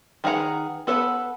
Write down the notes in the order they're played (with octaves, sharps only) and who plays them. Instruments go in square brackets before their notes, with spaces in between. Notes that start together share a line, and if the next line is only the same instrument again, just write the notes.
[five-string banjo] D#3 G#4 B4 F#5 A#5
B3 A4 B4 C#5 F#5